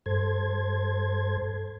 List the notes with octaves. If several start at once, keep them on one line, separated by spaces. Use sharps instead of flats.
G2 A4 C5 G#6